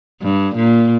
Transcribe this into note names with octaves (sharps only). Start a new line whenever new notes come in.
G2
A#2